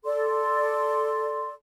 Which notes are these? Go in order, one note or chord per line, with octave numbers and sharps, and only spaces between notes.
A4 D5 C6